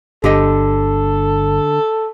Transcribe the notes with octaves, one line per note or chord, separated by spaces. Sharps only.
G1 D3 G4 A4 D#5